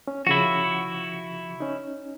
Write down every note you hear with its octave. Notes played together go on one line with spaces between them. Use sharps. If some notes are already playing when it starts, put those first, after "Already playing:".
C#4
C#3 F3 E4 F#4
C#4 D#4